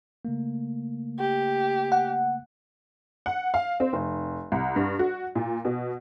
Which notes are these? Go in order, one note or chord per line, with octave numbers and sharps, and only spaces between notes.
C#3 A3 A#3
G4
F#5
F#5
F5
C4
F1
C2
G2
F#4
A#2
B2